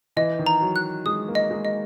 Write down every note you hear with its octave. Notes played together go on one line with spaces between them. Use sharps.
E3 D#5
D#3
A#5
F#3
F#6
G#3 D#6
A#3
D#5
G#3
D#5